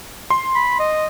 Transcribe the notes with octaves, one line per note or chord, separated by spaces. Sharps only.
C6
B5
D#5